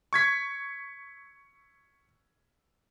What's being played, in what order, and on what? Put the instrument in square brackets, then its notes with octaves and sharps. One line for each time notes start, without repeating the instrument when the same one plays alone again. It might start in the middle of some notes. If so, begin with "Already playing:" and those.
[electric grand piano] C#6 G#6 B6